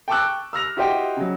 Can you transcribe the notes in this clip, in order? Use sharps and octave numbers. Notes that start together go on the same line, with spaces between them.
G5 A5 C#6 D6 E6 F#6
E6 F6 A#6 F7
E4 F#4 G4 C5 D#5 G5
C#3 F#3